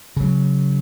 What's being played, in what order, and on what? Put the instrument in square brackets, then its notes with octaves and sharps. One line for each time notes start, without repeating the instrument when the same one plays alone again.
[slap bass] C#3 F#3